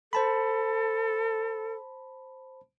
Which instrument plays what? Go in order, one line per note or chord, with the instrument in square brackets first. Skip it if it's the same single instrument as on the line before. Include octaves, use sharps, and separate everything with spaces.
[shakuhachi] A4 [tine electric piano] C5 A5 B5